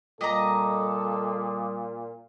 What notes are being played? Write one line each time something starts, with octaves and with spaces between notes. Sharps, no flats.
A#2 G3 A4 D#5 A#5 D6 D#6